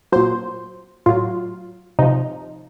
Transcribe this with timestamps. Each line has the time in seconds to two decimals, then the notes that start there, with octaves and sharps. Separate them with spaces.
0.12 A#2 F#3 C5
1.06 A2 F#3 F4
1.99 C3 F3 D#4